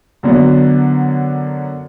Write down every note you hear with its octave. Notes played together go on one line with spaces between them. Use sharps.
F#2 D3 F#3 B3 D4